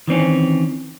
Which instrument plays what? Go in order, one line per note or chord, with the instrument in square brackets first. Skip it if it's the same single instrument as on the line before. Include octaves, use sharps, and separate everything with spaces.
[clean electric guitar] D#3 E3 C4 C#4